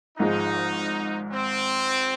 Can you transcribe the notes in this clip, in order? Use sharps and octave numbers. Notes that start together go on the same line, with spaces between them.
G#1 G#2 F3 G#3 D#4
C4